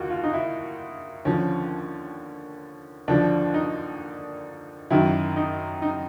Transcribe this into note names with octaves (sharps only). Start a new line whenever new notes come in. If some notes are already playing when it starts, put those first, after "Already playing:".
Already playing: D#2 F4 F#4
F4
D#4
E4
D#2 D3 F3 C#4
D#2 D3 F3 D4
D#4
F#2 D#3 F#3 E4
D#4
D#4